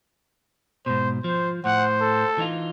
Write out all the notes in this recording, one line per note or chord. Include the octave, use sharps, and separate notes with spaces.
G#2 B2 C5
F3 C5
A2 C5 F#5
A4
E3 D#4 F4